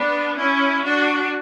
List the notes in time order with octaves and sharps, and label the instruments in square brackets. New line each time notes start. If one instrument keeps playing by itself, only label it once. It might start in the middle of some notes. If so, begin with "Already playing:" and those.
Already playing: [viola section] B3 D4
C#4 E4
D4 F#4